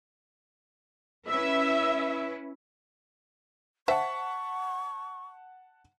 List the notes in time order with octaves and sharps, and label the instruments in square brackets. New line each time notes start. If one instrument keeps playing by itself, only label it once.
[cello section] C#4 E4 B4 [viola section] E5
[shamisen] C5 E5 [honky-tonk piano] F#5 A5 B6 [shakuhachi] C#6